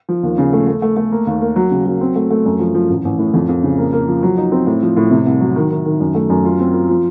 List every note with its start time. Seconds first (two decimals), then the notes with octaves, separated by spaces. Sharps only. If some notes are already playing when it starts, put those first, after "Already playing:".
0.09 F3
0.23 D#2
0.38 C#3
0.53 A3
0.67 A3
0.82 A3
0.97 A3
1.12 A#3
1.27 D#2
1.41 A#3
1.56 F#3
1.71 C#3
1.86 F#3
2.01 C4
2.16 A3
2.31 A3
2.45 F#2
2.59 F3
2.75 F3
2.90 A1
3.05 A1
3.19 A2
3.34 F2
3.49 F2
3.63 C#3
3.78 A#3
3.93 A#3
4.08 F3
4.23 F#3
4.38 D#4
4.52 C4
4.66 A2
4.82 F3
4.97 A2
5.11 C3
5.26 C2
5.41 F#3
5.56 D#3
5.71 D#3
5.86 D#3
6.00 F#2
6.15 A3
6.30 F#2
6.45 F4
6.60 C4
6.74 F4
6.89 F3